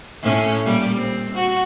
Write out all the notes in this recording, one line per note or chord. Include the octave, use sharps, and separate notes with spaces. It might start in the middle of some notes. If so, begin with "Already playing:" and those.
A2 C#4
A#2 G3
C4
F#4